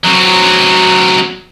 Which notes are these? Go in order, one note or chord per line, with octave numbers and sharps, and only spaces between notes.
F#3 C4